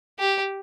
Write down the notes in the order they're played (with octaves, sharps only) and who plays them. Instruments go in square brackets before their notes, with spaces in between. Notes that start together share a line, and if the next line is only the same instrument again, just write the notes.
[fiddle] G4